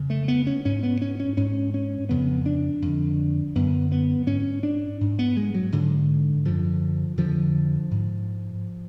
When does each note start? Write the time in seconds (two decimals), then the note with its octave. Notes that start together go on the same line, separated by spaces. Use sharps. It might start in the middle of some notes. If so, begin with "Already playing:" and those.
Already playing: F2 C#3
0.10 A3
0.28 B3
0.47 C#4
0.65 G#2 C#4
0.83 B3
1.02 C#4
1.20 C#4
1.37 G#2 C#4
1.74 C#4
2.09 F2 C#3 B3
2.46 D4
2.82 F2 D3
3.55 F#2 D3 B3
3.92 B3
4.27 G#2 C#4
4.63 D4
5.01 G#2
5.19 B3
5.37 G#3
5.54 F#3
5.72 G#2 D3
6.45 F#2 D3 F3
7.17 F2 D3 F3
7.91 G#2